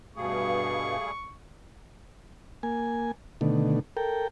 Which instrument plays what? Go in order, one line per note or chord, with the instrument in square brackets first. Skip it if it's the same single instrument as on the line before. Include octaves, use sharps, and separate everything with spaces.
[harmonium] G2 B2 [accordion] G3 A3 G#4 [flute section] F5 [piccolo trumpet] C#6
[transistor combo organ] A#3 G#5
B2 D3 D#3 A3
A4 A#4 G5